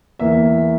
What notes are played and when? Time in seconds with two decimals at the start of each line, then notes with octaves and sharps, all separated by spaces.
0.19 E2 E3 A#3 E5